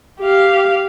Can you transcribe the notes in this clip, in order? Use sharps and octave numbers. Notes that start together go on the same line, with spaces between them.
G4 F5